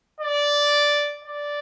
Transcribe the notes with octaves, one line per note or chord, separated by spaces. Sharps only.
D5
D5